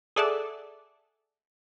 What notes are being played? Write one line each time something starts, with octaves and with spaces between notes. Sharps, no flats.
G#4 A4 D5 E5 F#5 A5